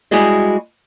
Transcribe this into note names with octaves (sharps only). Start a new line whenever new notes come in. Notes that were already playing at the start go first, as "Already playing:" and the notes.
G3 G#3 E4 F#4 G#4 D#5